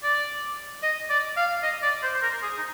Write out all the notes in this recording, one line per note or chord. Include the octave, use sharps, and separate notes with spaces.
D5
D#5
D5
F5
D#5
D5
C5
C5
A#4
G#4
D#4